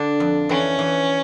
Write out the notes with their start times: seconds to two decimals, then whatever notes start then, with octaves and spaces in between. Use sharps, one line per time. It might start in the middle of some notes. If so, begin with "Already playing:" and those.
Already playing: D3 D4
0.20 F2
0.49 E3 C#4
0.79 E3